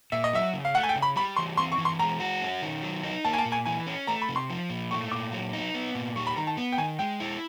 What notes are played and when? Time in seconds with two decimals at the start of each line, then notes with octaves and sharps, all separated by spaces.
0.12 A#2 E5
0.24 D#5
0.33 F#3 E5
0.54 C#3
0.65 F5
0.74 A3 F#5
0.83 G#5
0.89 G5
0.96 C#3
1.02 B5
1.16 G3 B5
1.37 E3 C6
1.57 C4 C6
1.72 C#6
1.78 E3
1.85 C6
1.99 G#3 A#5
2.20 F#4
2.41 C#4
2.62 D#3
2.82 F#3
3.03 D#4
3.25 A#3 A5
3.33 G#5
3.38 A5
3.45 A#2
3.52 G#5
3.65 E3 G#5
3.87 C#4
4.07 A3 A#5
4.22 B5
4.29 C3
4.36 C6
4.50 F3
4.70 A#2
4.91 A3 C#6
5.11 A#2 D6
5.32 F#3
5.53 D#4
5.74 B3
5.95 A#2
6.16 G3 C#6
6.27 B5
6.36 D#3 A#5
6.47 A5
6.57 B3
6.72 G5
6.78 D#3 G#5
6.99 G#3 G5
7.20 E4